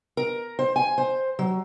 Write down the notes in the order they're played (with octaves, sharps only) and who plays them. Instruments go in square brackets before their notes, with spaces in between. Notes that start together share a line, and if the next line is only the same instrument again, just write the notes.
[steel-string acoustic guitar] A#4
C5
G#5
C5
F#3